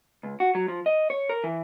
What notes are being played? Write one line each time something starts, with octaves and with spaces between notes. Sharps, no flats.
C#2
F#4
F#3
F3
D#5
C#5
A#4
E3